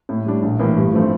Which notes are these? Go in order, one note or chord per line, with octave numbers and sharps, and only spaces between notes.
A2
G3 D4
A#1
A2 E3 A#3
G2
F3 A3 C4